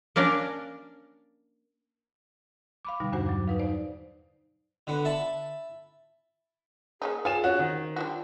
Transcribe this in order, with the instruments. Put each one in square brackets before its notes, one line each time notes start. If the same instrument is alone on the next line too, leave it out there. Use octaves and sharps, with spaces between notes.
[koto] A#3 C#4 D4 A#4 D5
[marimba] F5 B5 D6
B2 D3 G3 D#4
E2 G2 D4 F#4 C5 F#5
F#3 D6
D#4 B4 F5
D#4 C5 D5
[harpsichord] D3 B3
E5 A5 B5
[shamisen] A#3 C#4 D#4 [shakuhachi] G#4
[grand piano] F4 E7 [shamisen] C#5 G#5
[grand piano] C#4 F#4 [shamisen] F#5
[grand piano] D#3 [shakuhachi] C5
[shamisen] G3 D4 F#4 [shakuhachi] F4